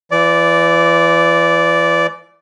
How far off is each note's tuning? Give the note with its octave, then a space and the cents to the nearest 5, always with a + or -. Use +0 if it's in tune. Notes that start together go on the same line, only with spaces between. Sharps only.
E3 +35 D5 -15